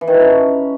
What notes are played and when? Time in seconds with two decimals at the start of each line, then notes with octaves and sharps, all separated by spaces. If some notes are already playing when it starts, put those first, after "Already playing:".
0.01 E3
0.08 D#3
0.14 D3
0.20 C#4